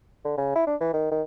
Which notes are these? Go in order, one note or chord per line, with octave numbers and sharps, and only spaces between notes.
D3
C#3
E4
D4
E3
D#3
D#3